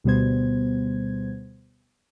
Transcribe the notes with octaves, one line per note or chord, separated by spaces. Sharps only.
D2 B2 G3 B3 C5 G#6